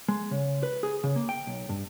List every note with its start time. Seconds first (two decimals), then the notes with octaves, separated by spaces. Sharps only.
0.08 G#3
0.31 C#3
0.63 B4
0.83 G#4
1.04 C#3
1.16 A#3
1.29 G5
1.47 B1
1.69 G2